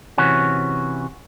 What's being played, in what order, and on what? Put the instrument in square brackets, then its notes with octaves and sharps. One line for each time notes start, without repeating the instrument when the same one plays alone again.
[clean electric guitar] C3 E3 C#4 F#4